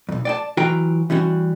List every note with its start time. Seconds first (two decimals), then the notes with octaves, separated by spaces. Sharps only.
0.09 B1 F2
0.25 D5 G5 A5
0.57 E3 F#3 F4 F#4 G5 A#5
1.10 E3 G3 C#4 F#4